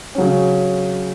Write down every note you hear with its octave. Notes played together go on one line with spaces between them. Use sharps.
C#3 F#3 C#4